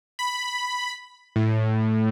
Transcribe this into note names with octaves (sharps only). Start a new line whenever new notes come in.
B5
A2